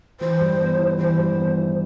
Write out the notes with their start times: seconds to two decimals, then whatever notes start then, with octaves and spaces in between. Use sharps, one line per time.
0.20 E3 C5
0.40 G2
0.59 B3
0.78 E4
0.98 E3 C5
1.18 G2
1.37 B3
1.57 E4